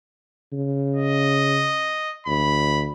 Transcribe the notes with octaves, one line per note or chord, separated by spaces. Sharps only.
C#3
D#5
D2 B5